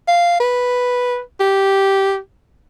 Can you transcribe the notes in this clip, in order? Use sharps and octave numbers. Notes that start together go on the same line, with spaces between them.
F5
B4
G4